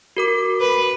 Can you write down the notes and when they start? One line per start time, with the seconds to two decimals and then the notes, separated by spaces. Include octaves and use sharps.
0.17 F#4 A#4 D6
0.61 B4